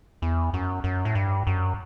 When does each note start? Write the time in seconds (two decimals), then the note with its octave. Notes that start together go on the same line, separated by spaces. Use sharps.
0.22 E2
0.54 F#2
0.84 F#2
1.05 A2
1.15 G2
1.47 F#2